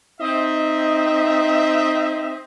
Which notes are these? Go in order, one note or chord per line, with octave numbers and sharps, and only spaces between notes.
C4 D#4 D#5 E5